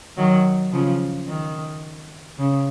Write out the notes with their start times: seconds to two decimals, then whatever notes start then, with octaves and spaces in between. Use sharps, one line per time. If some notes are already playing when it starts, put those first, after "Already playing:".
0.17 D#3 F#3
0.72 C#3 F3
1.28 D#3
2.39 C#3